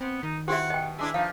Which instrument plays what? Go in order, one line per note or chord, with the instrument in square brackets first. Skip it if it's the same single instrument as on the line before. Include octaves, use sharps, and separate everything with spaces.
[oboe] B3 [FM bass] C4
[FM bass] D#3 [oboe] D#4
[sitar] C4 E4 [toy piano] F#4 G4 E5 [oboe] F#5
[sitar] B2 [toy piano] D#5 G5
[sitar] G#3 D4 E4 [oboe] E5
[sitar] F3 [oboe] D#4 [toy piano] F5